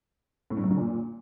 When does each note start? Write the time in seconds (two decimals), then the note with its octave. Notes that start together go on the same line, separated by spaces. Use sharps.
0.50 A2
0.57 G2
0.64 F#2
0.71 D3
0.77 A#2